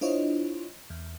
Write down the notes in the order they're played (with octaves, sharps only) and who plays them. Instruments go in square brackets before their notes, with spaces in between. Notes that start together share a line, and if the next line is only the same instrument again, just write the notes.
[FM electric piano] D4 E4 F4 C5 C#5 D#5
E2